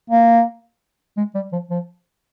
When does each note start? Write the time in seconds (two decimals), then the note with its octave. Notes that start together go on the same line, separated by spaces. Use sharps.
0.10 A#3
1.17 G#3
1.35 G3
1.53 F3
1.71 F3